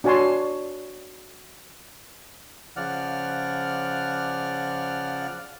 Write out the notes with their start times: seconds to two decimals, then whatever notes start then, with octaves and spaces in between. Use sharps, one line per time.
0.04 D4 F#4 C#5 G#5 A5 C6
2.76 C#3 F3 D5 F#5 F6